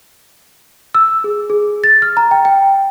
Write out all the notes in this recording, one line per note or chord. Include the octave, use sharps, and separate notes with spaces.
E6
G#4
G#4
A6
F6
A#5
G5
G5